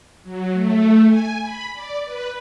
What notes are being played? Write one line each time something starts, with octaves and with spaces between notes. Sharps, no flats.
F#3
A3
G#5
B5
D5
B4